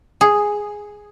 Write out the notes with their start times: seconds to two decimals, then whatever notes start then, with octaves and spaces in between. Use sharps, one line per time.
0.21 G#4